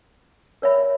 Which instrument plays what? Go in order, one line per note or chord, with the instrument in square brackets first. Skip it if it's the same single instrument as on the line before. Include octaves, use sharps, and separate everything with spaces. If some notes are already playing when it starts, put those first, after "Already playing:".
[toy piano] A#4 C#5 E5 B5